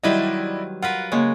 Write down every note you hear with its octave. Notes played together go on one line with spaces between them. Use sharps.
D#3 F#3 G3 E4 B4 C5 D5 D#5
F4 A#4 B4 F#5
C#3 G#3 A#3 C#5